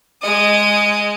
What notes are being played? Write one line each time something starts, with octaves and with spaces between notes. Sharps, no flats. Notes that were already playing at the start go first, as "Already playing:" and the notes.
G#3 D#5